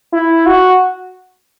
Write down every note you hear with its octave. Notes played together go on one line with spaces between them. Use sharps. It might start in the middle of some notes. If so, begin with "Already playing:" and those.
E4
F#4